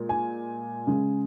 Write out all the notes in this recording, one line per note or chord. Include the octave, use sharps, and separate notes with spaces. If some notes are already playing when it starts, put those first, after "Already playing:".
Already playing: A#2 G#3
G#5
C#3 G#3